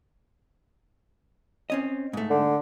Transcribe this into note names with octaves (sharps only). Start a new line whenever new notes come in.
C4 C#4 D#5
G#2 A3
D3